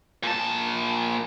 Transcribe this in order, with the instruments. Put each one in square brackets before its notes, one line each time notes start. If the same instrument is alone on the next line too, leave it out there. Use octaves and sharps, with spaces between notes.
[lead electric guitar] A#2 A5